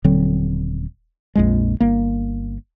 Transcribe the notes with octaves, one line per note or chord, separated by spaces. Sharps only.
D#1 D3 F#3 C4
A#1 F2 G#3
G1 A#3